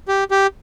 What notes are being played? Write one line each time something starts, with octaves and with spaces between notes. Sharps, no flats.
G4
G4